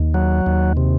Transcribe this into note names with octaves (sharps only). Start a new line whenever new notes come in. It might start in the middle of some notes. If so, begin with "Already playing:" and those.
Already playing: D#2
F#3
D#2
C3